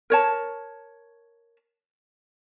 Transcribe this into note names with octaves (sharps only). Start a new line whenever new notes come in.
A#4 C#5 A5